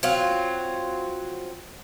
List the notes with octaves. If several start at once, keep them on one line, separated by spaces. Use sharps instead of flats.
F#3 C4 F4